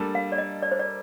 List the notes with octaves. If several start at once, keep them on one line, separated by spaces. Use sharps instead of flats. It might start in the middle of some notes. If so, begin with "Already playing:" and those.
Already playing: G3 A#3 D4 A4
F5
D5
D#5
D5
C5
D5